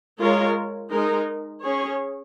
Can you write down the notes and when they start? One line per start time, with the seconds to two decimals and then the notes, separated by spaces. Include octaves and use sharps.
0.20 G#3 F4 A#4 C#5
0.91 G#3 D#4 A#4
1.62 C#4 G#4 C#5